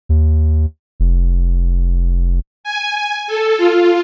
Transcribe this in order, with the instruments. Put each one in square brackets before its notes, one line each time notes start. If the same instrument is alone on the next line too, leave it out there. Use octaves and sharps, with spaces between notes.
[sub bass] D#2
F1
[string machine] G#5
A4
F4